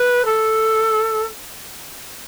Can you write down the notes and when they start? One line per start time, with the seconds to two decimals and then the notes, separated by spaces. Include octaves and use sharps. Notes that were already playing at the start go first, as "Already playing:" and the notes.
Already playing: B4
0.25 A4